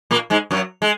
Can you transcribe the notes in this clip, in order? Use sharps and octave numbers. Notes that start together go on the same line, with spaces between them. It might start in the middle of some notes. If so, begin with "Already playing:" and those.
A#2 A#3
G#2 G#3
F#2 F#3
G#3